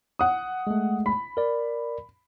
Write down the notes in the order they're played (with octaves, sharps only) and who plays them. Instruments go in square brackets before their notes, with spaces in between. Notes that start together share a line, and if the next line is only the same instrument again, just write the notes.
[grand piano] F#5 D#6
[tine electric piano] G#3 A3
[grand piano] B5
[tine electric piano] A#4 D5